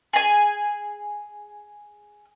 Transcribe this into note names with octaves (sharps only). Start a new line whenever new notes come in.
G#4 G#5